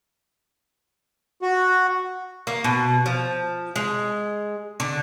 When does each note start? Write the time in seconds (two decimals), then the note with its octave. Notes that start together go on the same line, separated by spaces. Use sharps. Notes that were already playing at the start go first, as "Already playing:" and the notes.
1.42 F#4
2.47 A#3
2.64 B2
3.06 F3
3.76 G#3
4.80 D3